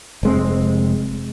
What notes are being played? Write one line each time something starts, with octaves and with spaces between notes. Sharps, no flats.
F1 G#3 C4